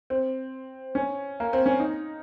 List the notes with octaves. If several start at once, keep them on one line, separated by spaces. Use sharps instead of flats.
C4
C#4
A#3
C4
C#4
D#4